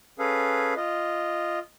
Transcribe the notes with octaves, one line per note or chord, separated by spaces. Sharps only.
C#4 G#4 A4 B4 F5
F4 D#5